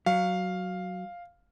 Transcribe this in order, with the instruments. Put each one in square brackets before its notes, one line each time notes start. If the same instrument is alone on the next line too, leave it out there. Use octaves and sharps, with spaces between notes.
[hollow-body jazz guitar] F#3 [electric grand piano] F5